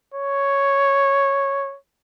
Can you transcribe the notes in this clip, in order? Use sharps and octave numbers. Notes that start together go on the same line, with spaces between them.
C#5